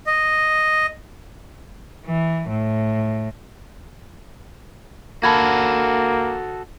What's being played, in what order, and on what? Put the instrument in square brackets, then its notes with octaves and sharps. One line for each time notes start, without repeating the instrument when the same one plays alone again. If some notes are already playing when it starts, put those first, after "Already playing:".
[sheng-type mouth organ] D#5
[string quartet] E3
A2
[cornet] A#3 [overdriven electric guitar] F#4 A4 [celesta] A5 B5 G#6